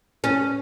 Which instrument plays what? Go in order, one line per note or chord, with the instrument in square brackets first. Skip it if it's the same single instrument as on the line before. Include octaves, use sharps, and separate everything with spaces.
[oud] C#4